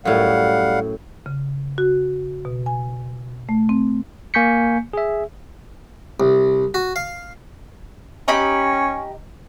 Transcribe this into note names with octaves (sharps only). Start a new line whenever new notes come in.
F#2 A2 G3 F5 F#5
C#3
F#4
B2
G#5
A3
C4
A#3 G#5 C#6 G6 B6 C#7
G#4 E5
C2
F#4
F5
C#4 D#4 G4 B5